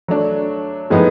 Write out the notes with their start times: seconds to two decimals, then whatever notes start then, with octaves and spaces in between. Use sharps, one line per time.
0.08 F#3 A3 D4
0.90 A2 F3 G#3 B3 D#4